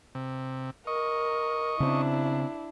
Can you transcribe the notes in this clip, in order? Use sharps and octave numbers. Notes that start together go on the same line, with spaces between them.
C3
A#4 D#5 C#6
C#3 C4 D4 E4